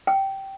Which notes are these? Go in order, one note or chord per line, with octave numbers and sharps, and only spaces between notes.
G5